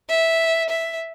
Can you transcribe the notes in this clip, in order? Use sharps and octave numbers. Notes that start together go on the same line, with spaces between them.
E5
E5